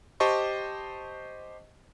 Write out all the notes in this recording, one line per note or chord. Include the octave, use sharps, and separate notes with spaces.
G4 C5 D#5 A5 C#6